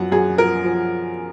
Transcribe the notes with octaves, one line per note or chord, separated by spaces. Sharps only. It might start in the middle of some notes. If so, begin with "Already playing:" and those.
Already playing: F#2 F3 F#5
F#2 G#4
F3 A#4
F3